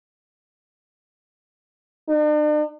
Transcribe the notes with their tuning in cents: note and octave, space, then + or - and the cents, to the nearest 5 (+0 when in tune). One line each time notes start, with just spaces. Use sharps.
D4 +45